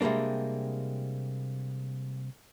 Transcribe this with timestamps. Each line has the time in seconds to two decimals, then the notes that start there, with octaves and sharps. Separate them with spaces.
0.01 C3 G3 G#3 A#3 D4